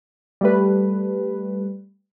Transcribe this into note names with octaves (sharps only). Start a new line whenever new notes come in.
G3 A3 B4